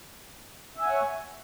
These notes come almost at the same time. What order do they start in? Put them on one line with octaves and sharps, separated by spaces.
E5 G#5 F#5 C#5